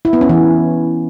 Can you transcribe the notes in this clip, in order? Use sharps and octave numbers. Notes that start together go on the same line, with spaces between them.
E4
B3
C#4
E3